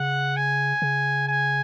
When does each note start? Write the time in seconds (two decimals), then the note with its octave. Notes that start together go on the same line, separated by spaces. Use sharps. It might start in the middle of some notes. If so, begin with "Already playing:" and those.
Already playing: C#3 F#5
0.36 G#5
0.82 C#3
1.28 G#5